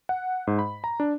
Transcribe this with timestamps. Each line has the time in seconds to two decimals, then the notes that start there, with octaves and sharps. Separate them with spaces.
0.09 F#5
0.47 G#2
0.59 B5
0.84 A#5
1.00 D4